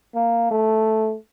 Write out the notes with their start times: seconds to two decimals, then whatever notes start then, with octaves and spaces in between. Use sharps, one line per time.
0.15 A#3
0.51 A3